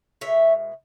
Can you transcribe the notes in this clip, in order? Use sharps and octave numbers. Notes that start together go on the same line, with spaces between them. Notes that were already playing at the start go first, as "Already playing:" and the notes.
B2 G#3 C#5 E5